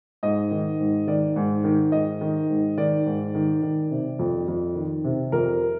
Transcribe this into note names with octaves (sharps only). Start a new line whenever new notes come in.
G#2 D#5
D#3
G#2
D#3 D5
G#2
D#3
G#2 D#5
D#3
G#2
D#3 D5
G#2
D#3
D#3
C3
F2
F2
D#3
C3
F2 A#4